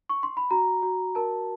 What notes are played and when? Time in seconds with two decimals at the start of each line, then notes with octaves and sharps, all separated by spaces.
0.09 C#6
0.23 C6
0.37 B5
0.51 F#4 A#5
0.82 F#4
1.15 A#4 A5